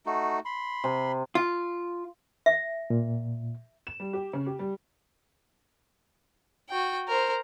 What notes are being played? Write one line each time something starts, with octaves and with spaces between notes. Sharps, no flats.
A3 D#4 F#4
B5 C6
C3
F4
E5
A#2
E7
G3
G4
C#3
G4
G3
F#4 G5
A#4 C5